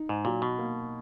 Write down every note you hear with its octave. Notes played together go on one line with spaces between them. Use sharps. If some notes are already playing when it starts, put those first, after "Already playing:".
Already playing: D#4
G#2
A#2 F#3
B2
A#3